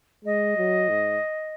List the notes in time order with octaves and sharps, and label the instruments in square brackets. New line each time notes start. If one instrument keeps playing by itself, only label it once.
[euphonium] G#3 [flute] D#5
[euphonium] F#3
G#2